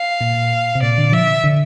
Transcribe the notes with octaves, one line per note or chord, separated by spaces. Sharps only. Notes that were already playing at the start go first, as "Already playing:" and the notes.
Already playing: F5
A#2
C3
A#2 D5
D3
F3 E5
D3